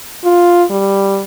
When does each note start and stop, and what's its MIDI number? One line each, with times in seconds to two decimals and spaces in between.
0.24 0.64 65
0.71 1.23 55